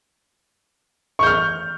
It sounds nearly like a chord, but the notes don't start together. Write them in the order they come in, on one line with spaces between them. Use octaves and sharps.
C#6 G6 F6